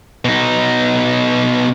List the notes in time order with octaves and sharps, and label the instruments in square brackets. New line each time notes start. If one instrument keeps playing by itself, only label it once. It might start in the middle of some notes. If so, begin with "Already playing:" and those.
[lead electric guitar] B2 D#4